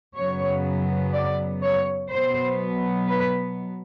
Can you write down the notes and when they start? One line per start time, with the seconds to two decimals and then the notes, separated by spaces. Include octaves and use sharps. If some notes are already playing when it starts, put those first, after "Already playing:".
0.15 F#2 C#3 F#3 B3 C#5
1.13 D5
1.62 C#5
2.10 B2 F#3 B3 C5
3.09 B4